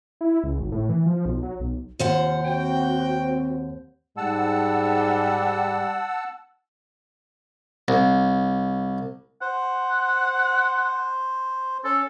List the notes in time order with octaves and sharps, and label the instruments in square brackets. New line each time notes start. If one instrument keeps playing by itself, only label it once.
[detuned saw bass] E4
C#2
G#1
A2
E3
F3
B1
F#3
B1
[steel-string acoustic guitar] D#2 C5 F#5 [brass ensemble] C3 [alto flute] F4
[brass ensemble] C4 [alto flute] F#4 [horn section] G5
[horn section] G#2 [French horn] G3 [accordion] F#5 A5 E6
[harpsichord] C2
[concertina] C5 [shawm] F#5
[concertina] C#4 [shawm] A4